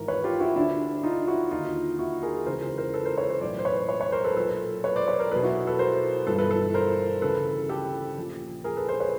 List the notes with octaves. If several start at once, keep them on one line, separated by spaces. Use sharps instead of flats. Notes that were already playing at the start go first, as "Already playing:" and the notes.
Already playing: G#1 G#2 E3 A#4
B4 C#5
F4 G4
E4 F#4
D2 D3 D4 E4
D#4 F4
E4 F#4
D#2 D3 D#4 F4
E4 F#4
G#4 A#4
C#2 C#3 E3 A#4 C5
A#4 C5
A#4 C5
A4 B4
A#4 C5
B4 C#5
A#4 C5
B1 A2 E3 C5 D5
C5
B4 C#5
B4 C#5
B4 C#5
A#4 C5
A4 B4
B1 A#2 A4 B4
B4 C#5
C5 D5
B4 C#5
A#4 C5
B1 B2 A4 B4
E4 F#4
A4 B4
A#4 C5
G1 G2 E3 A4 B4
A4 B4
A4 B4
A#4 C5
D2 C#3 E3 A4 B4
G4 A4
A#1 A#2
G#4 A#4
A4 B4
A#4 C5
B4 C#5